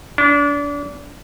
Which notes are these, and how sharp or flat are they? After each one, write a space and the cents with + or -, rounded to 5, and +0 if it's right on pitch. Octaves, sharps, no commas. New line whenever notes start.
D4 -30